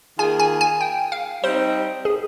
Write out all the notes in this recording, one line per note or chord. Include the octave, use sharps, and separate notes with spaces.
D#3 A#3 F4 G#4 G#5
G#5
G#5
G5
F5
G3 C4 D#4 C5
G#4